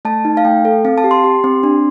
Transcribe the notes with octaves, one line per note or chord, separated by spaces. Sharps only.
A3 A5
D#4
F5
A3 G5
A4
C4 F5
A5
G4
C6
G4
C4
D4